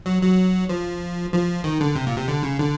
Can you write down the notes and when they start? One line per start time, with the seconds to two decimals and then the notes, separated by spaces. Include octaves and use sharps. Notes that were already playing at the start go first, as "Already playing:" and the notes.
0.06 F#3
0.22 F#3
0.69 F3
1.33 F3
1.64 D#3
1.81 D3
1.96 C3
2.07 A#2
2.17 C3
2.28 D3
2.43 C#3
2.59 D3